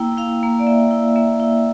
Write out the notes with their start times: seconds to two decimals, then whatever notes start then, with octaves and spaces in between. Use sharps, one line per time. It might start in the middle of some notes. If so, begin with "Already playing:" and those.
Already playing: A#3 E4 G5
0.18 E4 F5
0.43 A#3
0.59 D5
0.67 E4 E5
0.91 E4
1.16 A#3 E5
1.40 E4